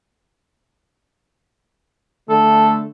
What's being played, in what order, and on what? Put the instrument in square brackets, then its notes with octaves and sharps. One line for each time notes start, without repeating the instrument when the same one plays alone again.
[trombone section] D3 A3 [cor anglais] A4